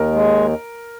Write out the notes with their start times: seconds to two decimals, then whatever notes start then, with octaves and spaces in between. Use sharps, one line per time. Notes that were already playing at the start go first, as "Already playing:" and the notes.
Already playing: D#2 A#4
0.13 G#3